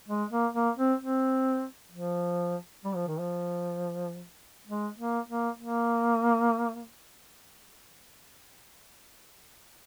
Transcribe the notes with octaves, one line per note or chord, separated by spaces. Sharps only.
G#3
A#3
A#3
C4
C4
F3
G3
F3
D#3
F3
G#3
A#3
A#3
A#3